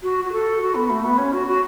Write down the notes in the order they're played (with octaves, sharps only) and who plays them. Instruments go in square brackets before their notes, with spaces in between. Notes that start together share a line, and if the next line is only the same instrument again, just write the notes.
[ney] F#4
F#4
A4
F#4
B3
A3
B3
C#4
F#4
F#4